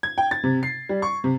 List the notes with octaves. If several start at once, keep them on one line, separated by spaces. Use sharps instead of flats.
G#6
G5
A6
C3
C7
G3
C#6
C3